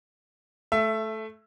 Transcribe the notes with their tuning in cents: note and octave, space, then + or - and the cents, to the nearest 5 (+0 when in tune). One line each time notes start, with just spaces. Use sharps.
A3 -10 E5 +15